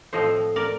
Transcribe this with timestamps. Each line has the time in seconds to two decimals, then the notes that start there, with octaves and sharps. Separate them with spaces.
0.13 A2 F3 C4 C5 D#5
0.56 A#4 D5